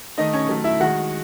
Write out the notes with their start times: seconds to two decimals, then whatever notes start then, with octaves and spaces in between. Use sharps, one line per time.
0.18 D#3 A3 D#4 D#5
0.33 C#4 C#5
0.49 D#3 F#3 A3
0.64 E4 E5
0.80 D#3 G#3 F#4 F#5